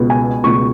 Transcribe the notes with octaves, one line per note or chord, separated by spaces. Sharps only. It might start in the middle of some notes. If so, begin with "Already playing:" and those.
Already playing: C#2 B2
G#5
C#2 B2 C#6